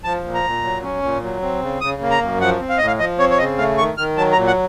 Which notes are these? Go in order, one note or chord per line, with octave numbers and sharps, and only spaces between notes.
F3 A5
A#2
A#5
A#2
F#3
C#4
A#2
F#3
C4
C#3
C#3 D#6
A#3
A#5
F#2
F3 F#5
C4
F5
A2 D#5
F5
F3 D#5
C4 C#5
C#5
C#3 D#5
A3 F5
D#3 C#6
D#3 F6
F#3 A5
A#5
A#2
F#5